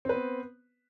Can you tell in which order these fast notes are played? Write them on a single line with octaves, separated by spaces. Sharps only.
C4 B4 B3